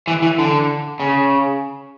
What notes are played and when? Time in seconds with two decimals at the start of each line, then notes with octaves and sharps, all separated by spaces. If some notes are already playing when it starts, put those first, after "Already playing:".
0.07 E3
0.22 E3
0.39 D3
1.00 C#3